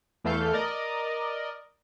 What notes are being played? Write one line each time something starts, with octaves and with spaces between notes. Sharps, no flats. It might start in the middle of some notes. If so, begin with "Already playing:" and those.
E2 E3 A3 A4 F5 G6
A#4 D5 D#5